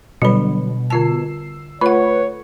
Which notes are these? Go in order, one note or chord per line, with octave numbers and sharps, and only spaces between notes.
B2 D3 F#3 G3 B4 B5
D3 F4 A5 E6 C7
A3 F4 B4 C#5 F#5